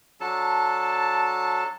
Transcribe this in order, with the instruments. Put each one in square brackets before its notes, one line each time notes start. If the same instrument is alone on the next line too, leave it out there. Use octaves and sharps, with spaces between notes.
[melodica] F#3 D4 A4 A5